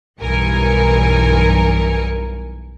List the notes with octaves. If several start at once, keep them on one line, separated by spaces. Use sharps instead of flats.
B1 G2 E3 A#4 G#5 C#7